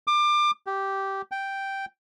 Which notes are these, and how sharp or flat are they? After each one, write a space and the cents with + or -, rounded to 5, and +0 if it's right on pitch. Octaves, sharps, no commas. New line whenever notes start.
D6 +30
G4 -10
G5 -5